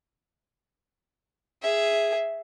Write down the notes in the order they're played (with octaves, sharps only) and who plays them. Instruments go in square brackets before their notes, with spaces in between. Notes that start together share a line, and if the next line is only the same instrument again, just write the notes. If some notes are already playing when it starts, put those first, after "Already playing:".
[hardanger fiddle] G#4 E5